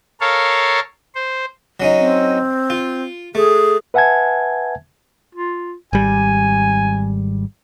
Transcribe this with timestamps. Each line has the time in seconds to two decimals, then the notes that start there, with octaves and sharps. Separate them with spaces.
0.21 A4 A#4 C#5 F5
1.15 C5
1.80 F#3 C#4 D#4
1.99 C4
2.70 F4
3.35 A3 G#4
3.94 B4 E5 F#5 G#5 A5 G#6
5.35 F4
5.93 G#1 G3 G#5